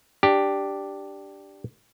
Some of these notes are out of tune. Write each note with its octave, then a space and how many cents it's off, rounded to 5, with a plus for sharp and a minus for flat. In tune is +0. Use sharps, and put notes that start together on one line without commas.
D4 +0 G4 +0